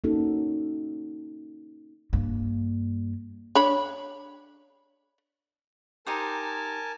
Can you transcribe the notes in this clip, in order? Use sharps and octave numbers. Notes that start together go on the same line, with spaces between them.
A#3 C#4 D#4 F#4 A4
G2 A#3
D4 C#5 B5
D#4 G4 A#4 C5 G#5 A5